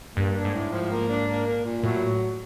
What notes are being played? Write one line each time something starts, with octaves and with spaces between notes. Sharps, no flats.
G2 A#3
D4
G#2
A2
F3
A#3
D4
A#3
A#2
A#2
A2 F#3